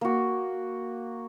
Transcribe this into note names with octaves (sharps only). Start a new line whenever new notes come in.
A#3 F#4